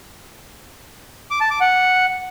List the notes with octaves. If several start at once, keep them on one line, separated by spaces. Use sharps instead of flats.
D6
A5
D6
F#5